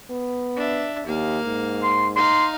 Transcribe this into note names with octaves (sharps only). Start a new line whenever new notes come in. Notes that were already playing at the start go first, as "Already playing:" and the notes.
B3
D4 E5
D#2 A#3 F5
G#2
C6
D#4 F5 C6